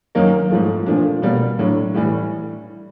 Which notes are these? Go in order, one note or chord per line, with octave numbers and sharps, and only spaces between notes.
F#2 D#3 F#3 A#3 D#4
G#2 F3 A3
A#2 F3 A3 D4
B2 G3 A#3
A2 F#3 A3 D4
A2 E3 G3